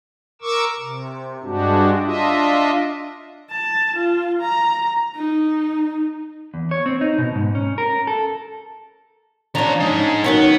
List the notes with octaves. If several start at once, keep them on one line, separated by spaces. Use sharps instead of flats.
A#4 C#6 D6 E6
C3
G2 G#3 D4 F#4 G4
D4 F4 D#5 E5
A5
F4
A#5
D#4
E2
C#5
C4
D#4
B2
G#2
C#4
A#4
A4
F3 C#4 D4 A#5
G#3 D#4
D#3 F#3 B3 C#4